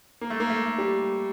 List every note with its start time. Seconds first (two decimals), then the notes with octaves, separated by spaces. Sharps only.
0.21 A#3
0.30 A3
0.40 A#3
0.50 A3
0.78 G3